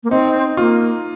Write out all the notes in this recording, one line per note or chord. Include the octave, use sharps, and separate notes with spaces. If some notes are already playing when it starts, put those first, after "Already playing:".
A#3
C4 D#4
A#3 F4